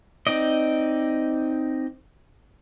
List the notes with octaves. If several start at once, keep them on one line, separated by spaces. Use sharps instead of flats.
C4 D#4 D5 D#5